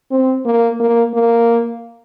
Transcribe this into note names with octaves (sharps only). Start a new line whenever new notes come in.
C4
A#3
A#3
A#3